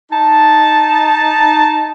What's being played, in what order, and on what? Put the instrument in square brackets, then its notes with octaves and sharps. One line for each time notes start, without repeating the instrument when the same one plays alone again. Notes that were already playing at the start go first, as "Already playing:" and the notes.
[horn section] D#4 A5